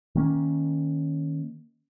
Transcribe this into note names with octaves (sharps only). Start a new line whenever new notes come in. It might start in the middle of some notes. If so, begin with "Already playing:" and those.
D#3 A#3 C#4